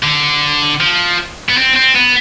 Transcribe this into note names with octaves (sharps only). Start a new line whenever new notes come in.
D3
F3
B3
C4
C4
B3